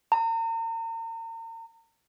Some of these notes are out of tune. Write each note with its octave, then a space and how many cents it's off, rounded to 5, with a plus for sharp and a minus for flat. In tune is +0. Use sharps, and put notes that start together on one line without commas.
A#5 -40